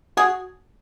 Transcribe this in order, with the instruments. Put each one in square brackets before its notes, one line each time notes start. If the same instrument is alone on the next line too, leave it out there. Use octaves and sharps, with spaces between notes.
[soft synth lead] F#4 [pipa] G#4